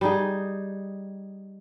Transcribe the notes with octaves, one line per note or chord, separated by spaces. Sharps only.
G3 D#4 G#4